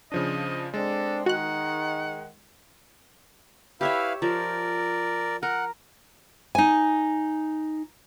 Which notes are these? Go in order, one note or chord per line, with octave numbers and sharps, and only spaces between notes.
C#3 F3 D4 D#5
G#3 C4 D4 A4
D#3 F#4 F#5 F#6
E4 G4 B4 C#5 E5 F5
F3 A#4 D5
A#4 F#5
D#4 G#5